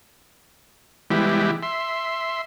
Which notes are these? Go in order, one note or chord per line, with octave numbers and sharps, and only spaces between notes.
E3 G3 G#3 B3 E4 G4
E5 C6